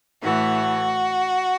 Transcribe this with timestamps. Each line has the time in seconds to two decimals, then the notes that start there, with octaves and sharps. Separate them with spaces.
0.23 A2 E3 A3 F#4